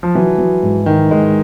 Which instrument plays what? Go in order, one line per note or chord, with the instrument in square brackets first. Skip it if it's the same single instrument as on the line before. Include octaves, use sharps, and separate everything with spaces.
[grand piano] F3
[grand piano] E3 [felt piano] F#3
[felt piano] F#3
G#2
[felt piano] G#2 [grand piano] D#3
[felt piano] G#2 [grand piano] G#3